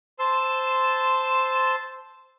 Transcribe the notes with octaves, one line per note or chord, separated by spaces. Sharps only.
C5 A5 C6 E6